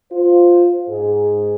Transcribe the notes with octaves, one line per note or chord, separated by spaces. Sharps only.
F4 C5
G#2 G#4